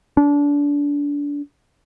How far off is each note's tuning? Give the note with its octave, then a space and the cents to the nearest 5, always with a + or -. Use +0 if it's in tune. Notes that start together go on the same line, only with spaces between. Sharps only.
D4 -25